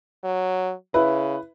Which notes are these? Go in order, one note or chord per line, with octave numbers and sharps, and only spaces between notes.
F#3
C#3 E4 B4